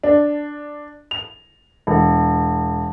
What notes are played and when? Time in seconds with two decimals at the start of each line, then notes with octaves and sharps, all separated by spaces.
0.04 D4
1.11 F7
1.87 E1